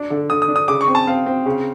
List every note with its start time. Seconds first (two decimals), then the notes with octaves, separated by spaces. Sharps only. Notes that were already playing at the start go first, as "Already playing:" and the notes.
Already playing: D4
0.10 D3
0.30 D3 D#6
0.42 D#6
0.48 D4
0.56 D#6
0.68 C#3 D6
0.81 C#6
0.88 C4
0.95 A5
1.07 C4 F5
1.26 C4
1.45 C#3